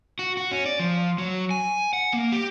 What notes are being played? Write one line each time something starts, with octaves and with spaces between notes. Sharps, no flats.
F#4
F#4
C#4
D5
F3
F#3
G#5
F#5
A#3
G4